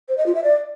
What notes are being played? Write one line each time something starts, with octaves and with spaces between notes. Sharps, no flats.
C5
D#5
F4
E5
D5